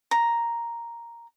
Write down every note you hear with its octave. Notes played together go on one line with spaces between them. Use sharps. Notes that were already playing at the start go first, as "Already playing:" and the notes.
A#5